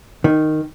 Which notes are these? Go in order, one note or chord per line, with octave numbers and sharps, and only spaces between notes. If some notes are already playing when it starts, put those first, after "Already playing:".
D#3